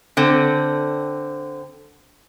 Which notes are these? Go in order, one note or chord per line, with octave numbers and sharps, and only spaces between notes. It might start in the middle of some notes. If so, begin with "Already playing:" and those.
D3 C4